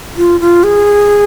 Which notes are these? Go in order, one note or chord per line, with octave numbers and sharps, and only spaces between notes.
F4
F4
G#4